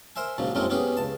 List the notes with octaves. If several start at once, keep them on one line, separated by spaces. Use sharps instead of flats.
A#4 C5 E5 G#5
A#1 G#2 C#3 F#3
F#2 A2 F#3 G#3 C4 A#4
B3 C#4 G4 G#4
C#2 A5